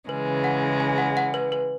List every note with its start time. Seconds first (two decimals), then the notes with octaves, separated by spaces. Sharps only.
0.08 C#3 E3 G#3 B4
0.44 F#5
0.80 G#5
0.98 F#5
1.17 F#5
1.34 B4
1.52 B4